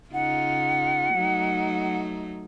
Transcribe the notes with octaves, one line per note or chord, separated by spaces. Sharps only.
C#3 D#4 F4 F#5
F#3 A3 D#4